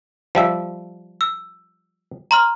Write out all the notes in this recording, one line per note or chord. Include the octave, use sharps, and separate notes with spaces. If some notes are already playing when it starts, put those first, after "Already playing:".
F3 G3 E5
E6
A#5 C6 F6